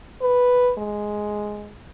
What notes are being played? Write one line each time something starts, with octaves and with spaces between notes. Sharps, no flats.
B4
G#3